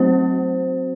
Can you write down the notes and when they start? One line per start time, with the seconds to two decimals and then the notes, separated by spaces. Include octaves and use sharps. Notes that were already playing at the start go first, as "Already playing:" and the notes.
Already playing: F#3 A3 C4 F#4 C5